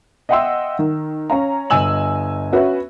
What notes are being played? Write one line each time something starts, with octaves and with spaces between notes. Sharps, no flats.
D#5 E5 F#5 G5 C6 E6
D#3
C#4 C#5 F5 A#5
G1 D#5 G#5 E6 F#7
C#4 F#4 B4 E5